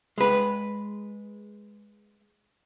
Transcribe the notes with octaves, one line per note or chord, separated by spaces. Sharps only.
G#3 B4